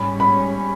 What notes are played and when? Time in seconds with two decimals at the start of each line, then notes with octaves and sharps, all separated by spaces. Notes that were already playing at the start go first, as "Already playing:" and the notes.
Already playing: G#2 G3 C#4 B5
0.20 B5